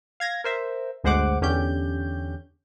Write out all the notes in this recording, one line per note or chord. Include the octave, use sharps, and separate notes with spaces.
F5 G#6 A#6
A#4 C5 E5
G1 D2 G#3 C5 F#5 D6
E2 D3 C#4 G4 G6